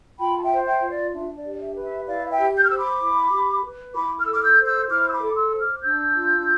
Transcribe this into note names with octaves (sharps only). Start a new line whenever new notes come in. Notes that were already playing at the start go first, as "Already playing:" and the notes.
F4 G5 B5
A5
E5 G5
C5
E5 G5
F4
D5
D4 E5
D5
G4
D5
E5
B4
E5
E4 D5 F5
F5
E5 G5
G4
G6
F6
C5 E6
B5 D6
E4
G4
B4
E4 B5 D6
F6
A4 E6
D6 F6
E6 G6
C5
E6 G6
E4 D6 F6
E6
B5 D6
A4
C6 E6
C5
D6 F6
D4 E6 G6
F4